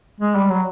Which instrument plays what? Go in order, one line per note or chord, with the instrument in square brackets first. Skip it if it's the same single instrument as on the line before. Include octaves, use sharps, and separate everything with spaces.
[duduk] G#3
G3
F#3